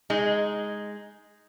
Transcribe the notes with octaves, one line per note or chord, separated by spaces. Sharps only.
G#3 D#4